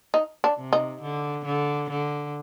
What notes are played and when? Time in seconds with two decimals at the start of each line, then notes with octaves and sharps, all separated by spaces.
0.14 D#4
0.44 D4
0.58 C3
0.73 D#4
1.01 D3
1.45 D3
1.90 D3